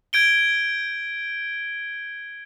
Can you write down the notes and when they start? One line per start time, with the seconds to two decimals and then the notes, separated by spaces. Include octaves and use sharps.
0.13 G6 G#6 D7 G7